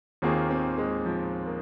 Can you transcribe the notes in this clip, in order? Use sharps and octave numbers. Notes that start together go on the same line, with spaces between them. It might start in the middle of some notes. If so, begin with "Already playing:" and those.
D#2 D#3 A#3 C4 F4 G#4
C4
G#3
F3
A#3